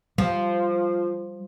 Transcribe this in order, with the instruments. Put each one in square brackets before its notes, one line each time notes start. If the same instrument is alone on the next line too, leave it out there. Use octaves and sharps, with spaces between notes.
[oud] F3 [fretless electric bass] G3